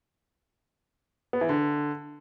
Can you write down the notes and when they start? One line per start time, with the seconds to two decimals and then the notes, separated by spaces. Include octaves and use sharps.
1.33 B3
1.41 E3
1.49 D3